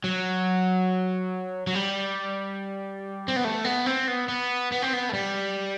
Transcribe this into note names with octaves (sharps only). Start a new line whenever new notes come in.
F#3
F#3
G3
C4
B3
A3
B3
C4
B3
B3
B3
C4
B3
A3
G3